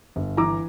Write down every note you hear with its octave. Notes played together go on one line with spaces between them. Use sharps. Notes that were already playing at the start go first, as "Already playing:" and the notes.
G1
E3 A#5 D6